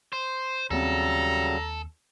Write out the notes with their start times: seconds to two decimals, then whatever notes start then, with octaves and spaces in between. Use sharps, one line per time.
0.13 C5
0.71 D#2 C#3 F#3 G3 C4 A4 A#5